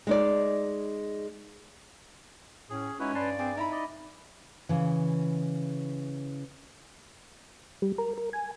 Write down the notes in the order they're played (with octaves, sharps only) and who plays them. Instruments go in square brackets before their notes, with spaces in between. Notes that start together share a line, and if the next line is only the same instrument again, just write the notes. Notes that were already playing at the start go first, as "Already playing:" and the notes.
[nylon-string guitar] G#3 D#4 D5
[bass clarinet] A2 [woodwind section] C#4 [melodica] G#4
[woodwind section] G#3 D#4 [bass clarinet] C#4 [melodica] E4 F#4 B4
[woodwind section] G2 D5 [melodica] B4 A5 C6
[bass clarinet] C4 [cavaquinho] G#4 [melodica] D6
[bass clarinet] D#4 [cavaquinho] E4 B5 [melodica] A#5
[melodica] D5 D#5
[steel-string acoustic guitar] C#3 E3
[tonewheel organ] G3
A#4
A#4
G#5